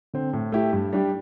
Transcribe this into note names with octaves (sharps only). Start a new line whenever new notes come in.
D3 C4
A2
A3 E4 G4
G2
G3 D4 G4